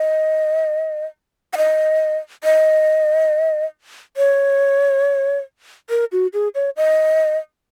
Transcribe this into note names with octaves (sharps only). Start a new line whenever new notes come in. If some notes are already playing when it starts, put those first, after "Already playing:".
Already playing: D#5
F#5
D#5
D#5
C#5
A#4
F#4
G#4
C#5
D#5